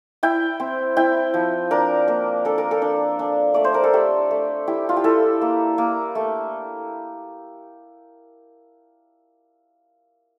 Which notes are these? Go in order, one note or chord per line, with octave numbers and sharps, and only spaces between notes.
E4 G5
C4
E4 G5
F3
D4 A#4
A#3
D4 A4
A#4
A4
D4
D4
A3 D5
C5
A#4
A4
A3 G4
A3
E4 G4
F4
G4
E4 A4
A#3
A#3
A3